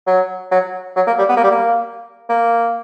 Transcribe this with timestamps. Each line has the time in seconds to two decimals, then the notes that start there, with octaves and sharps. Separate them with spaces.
0.07 F#3
0.51 F#3
0.96 F#3
1.07 A#3
1.18 G3
1.29 B3
1.37 A#3
1.44 G3
1.51 A#3
2.30 A#3